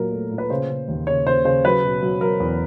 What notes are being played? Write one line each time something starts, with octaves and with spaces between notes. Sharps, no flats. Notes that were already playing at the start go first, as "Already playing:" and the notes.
Already playing: A#2 F#3 A#4
A3
A#2
B4
C#3 C5
C#3
D#2
C#3 C#5
C#3 C5
C#3 C5
F#3 B4
B2
F#3
F#3 A#4
E2